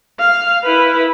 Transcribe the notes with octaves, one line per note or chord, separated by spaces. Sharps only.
F5
E4 B4